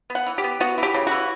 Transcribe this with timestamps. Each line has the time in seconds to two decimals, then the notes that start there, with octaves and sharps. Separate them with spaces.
0.10 B3
0.15 F#5
0.26 E3
0.38 G4
0.44 B3
0.60 B3 F#4
0.78 E3
0.83 G4
0.94 C#3
1.07 E3 F#4